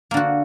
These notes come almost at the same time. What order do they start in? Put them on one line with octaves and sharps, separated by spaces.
A#3 D3 F#4